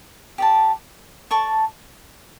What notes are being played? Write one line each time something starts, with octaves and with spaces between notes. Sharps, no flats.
G4 D5 A5
A4 D5 A5 C#6